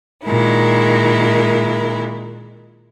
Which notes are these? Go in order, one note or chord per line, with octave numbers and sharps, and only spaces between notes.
A#2 D#3 G#3 E4 A#4